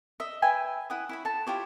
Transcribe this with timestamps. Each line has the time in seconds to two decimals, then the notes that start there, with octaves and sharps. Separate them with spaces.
0.20 D#5 E5
0.42 B4 E5 G5 G#5
0.90 E4 F#5 D#6
1.09 E4 C#5 B5
1.25 A4 A5
1.47 E4 F4 G4 C#5